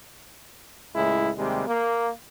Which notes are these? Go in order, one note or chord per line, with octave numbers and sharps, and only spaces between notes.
C#2 A2 G#3 E4
D#2 C3 G3 G#3
A#3